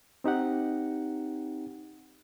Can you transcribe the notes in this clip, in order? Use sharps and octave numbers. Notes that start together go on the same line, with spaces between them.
C4 D#4 G4 F#5